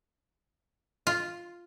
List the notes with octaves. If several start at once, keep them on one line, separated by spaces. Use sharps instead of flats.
F4